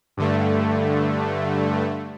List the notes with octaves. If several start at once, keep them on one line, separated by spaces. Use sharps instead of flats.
G2 D3 A3